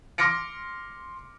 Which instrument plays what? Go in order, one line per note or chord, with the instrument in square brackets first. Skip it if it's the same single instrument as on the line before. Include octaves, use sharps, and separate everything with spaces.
[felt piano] C6 D6 F6 A#6 C#7 D7